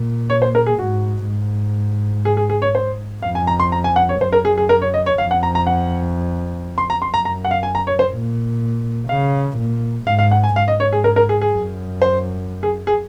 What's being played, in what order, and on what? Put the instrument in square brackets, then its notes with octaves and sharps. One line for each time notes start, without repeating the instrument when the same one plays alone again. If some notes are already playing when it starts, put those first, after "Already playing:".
Already playing: [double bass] A#2
[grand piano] C#5
C5
A#4
G#4
[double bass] G#2 [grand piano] F#4
[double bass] G#2
[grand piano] G#4
G#4
G#4
C#5
C5
[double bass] F2 [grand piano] F5
[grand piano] G#5
A#5
C6
A#5
G#5
F#5
C#5
[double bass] F#2 [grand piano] C5
[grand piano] A#4
G#4
G#4
A#4
C#5
D#5
C#5
[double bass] F2 [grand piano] F5
[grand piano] F#5
A#5
A#5
F#5
C6
A#5
C6
[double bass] F#2 [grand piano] A#5
[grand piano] A#5
F#5
F5
G#5
A#5
C#5
C5
[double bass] A#2
[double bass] C#3 [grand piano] F5
[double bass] A#2
[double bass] G#2 [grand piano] F5
[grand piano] F5
F#5
G#5
[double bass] G#2 [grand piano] F5
[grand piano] D#5
C#5
G#4
A#4
A#4
G#4
G#4
[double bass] F#2
[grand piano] C5
G#4
G#4